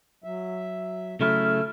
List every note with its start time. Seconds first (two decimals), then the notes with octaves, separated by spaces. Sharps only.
0.24 F#3 E5
1.21 C#3 F#3 A3 E4 F6